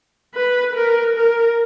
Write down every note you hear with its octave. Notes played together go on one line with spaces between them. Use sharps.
B4
A#4
A#4